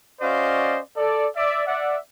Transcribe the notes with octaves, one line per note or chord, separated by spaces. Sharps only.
C#4 F#4 C5 D5 D#5 F5
A4 D5
D5 E5
D5 E5 F#5